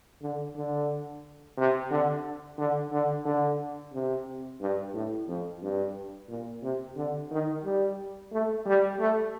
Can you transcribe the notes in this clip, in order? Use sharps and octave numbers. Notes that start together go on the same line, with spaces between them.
D3
D3
C3
D3
D3
D3
D3
C3
G2
A2
F2
G2
A#2
C3
D3
D#3
G3
A3
G3
A3